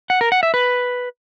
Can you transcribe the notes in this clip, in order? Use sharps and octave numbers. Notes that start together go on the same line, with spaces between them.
F#5
A#4
F#5
E5
B4